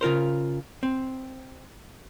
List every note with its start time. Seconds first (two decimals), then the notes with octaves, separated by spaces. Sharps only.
0.01 C#3 F4 A#4 C5
0.83 C4